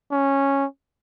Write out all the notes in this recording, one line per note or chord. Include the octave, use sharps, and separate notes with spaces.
C#4